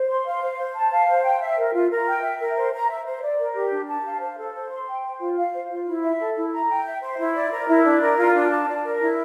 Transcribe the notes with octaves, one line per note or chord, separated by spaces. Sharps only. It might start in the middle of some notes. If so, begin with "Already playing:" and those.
Already playing: C5
C6
F5
C5
C5
A5
F5
C5
G5
E5
A#4
F4
A#4
G5
E5
A#4
C5
A#5
E5
C5
D5
A#4
G4
D4
A5
F5
C5
A4
C5
C6
G5
C5
F4
F5
C5
F4
E4
E5
A4
E4
A#5
G5
E5
C5
E4
D5
A#4
E4
D4
A#4
F4
D4
A5
D5
A#4
E4